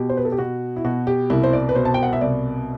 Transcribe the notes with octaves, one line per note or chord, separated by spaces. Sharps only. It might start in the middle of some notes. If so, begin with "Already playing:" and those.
Already playing: B2 G4
C5
B4
A4
G4
B2 F#4
E4
B2 F#4
G4
C2 E4
C5
D5
B4
B2 C5
A5
G5
F#5
E5
C2 D5